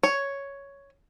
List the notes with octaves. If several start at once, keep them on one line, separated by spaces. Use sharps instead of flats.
C#5